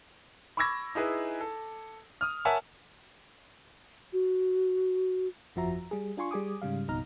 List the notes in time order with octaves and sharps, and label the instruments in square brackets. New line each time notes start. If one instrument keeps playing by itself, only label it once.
[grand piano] B5 C#6 D6 E6 G#6 A#6
D#4 E4 G#4 B4
A4
D#6 F6
A#4 C#5 E5 F#5 G#5 A5
[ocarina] F#4
[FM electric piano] G1 F2 F3 F#4 E5 A#5
G3 G#4
D4 F4 G#5 C6 C#6
G3 G#4 G#5 D6 D#6
G#2 C#3 G3 F5
A1 F2 B2 D#4 A#5 F6